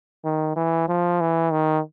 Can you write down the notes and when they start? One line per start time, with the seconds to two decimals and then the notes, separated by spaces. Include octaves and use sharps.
0.25 D#3
0.56 E3
0.88 F3
1.20 E3
1.52 D#3